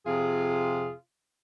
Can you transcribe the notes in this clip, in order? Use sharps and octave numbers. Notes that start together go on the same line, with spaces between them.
F2 C3 F4 G#4